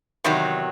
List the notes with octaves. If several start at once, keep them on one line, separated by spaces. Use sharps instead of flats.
E2 C3 D#3 F#3